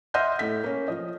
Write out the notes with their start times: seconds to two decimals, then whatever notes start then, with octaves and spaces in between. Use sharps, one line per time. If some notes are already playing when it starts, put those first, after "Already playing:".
0.14 D#5 E5 F#5 C6 F6 G6
0.39 A2 A3 B6
0.64 A#3 C#4
0.88 F3 D#5